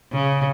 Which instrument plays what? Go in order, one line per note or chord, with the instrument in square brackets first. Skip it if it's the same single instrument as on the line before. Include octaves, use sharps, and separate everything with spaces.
[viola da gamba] C#3